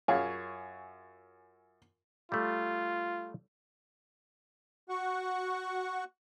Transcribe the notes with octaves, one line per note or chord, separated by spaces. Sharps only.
F#2 F4 G#4 C#5
G3 A3 F4
F#4 F#5 C#6